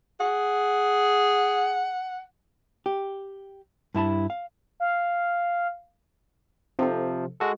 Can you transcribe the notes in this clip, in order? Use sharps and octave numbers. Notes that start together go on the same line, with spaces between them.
G#4 F#5
G4
G2 E4 A5 B5
F5
F5
C3 F3 C4 D#4 A4
G#3 F#4 A4